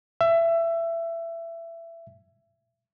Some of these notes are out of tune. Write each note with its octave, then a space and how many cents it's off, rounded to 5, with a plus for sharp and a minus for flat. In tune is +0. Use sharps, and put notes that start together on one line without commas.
E5 +20